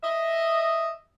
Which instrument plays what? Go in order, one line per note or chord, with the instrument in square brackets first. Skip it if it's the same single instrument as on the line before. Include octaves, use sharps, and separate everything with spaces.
[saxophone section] D#5 E5